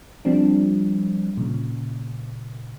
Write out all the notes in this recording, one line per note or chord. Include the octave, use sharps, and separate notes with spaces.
F3 G3 C4 D4
A#2 C#3